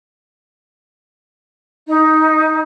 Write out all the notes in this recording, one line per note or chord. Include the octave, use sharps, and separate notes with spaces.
D#4